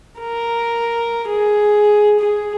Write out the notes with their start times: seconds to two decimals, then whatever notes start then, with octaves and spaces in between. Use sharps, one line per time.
0.19 A#4
1.28 G#4
2.20 G#4